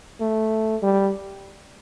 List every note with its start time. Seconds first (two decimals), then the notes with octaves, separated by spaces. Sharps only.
0.20 A3
0.83 G3